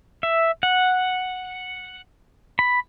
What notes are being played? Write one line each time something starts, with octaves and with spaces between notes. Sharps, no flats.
E5
F#5
B5